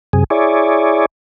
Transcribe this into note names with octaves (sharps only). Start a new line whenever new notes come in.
F#2 C3 G#4
E4 G#4 C#5 D5